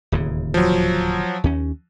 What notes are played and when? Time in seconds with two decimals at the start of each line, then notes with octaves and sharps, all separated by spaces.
0.12 D1 D#2 C#3
0.54 F3 F#3
1.44 D#2 C#4